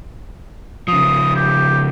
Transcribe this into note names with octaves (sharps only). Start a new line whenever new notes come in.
C#3 F3 D#6
G4